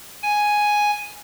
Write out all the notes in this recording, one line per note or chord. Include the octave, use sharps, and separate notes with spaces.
G#5